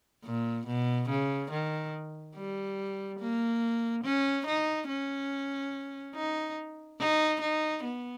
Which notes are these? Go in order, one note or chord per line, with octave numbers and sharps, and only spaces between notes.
A#2
B2
C#3
D#3
G3
A#3
C#4
D#4
C#4
D#4
D#4
D#4
B3